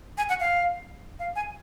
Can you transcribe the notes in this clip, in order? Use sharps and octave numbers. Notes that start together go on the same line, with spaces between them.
G#5
F#5
F5
F5
G#5